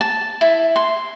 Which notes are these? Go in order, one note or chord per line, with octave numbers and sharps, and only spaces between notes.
A5
E4
C6